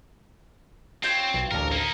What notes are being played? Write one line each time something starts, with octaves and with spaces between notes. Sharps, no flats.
C4 F4 C#5 G5
B1
A1 D2 A4 A#4
A#3 D#4